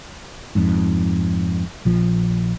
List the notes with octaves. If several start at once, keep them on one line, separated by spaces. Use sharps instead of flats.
F2 G#2
A#1 F3